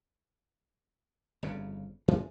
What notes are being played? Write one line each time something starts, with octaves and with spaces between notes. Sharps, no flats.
G1 F2 C#3
F#2 E3 F3 G#3